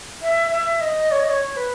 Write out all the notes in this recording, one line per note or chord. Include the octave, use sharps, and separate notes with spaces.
E5
E5
D#5
C#5
D#5
C#5
B4